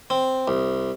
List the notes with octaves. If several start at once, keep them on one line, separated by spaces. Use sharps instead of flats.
C4
C2